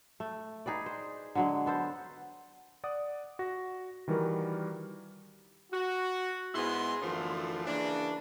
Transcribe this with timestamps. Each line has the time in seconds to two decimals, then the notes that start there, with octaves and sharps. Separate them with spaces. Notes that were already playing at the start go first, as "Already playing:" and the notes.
0.20 A3
0.66 D#4 G#4 B4 D5
0.86 C5
1.35 D3 F#3 G#3
1.66 B3 A4 C5
2.84 D5 F#5 D#6
3.39 F#4 A#6
4.08 D#3 E3 G3 F#4 A#4
5.71 F#4
6.53 G#2 G#3 B3 E4 G#4 C6
7.00 F#2 D3 E3 F3 A3 C6
7.64 C#3 E3 A#3 D4